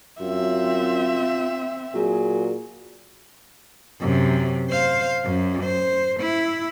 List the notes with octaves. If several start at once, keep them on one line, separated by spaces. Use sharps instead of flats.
F#2 C4 F4 E5
A#2 F#3 G#4
F#2 C3
C5 F5
F#2
C5
E4